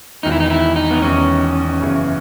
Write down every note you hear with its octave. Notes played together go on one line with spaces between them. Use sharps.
E1 E2 D#3 D#4
E4
D#4
E4
D#4
B3
E1 E2 D#3 C#4
F#1 E2 C#3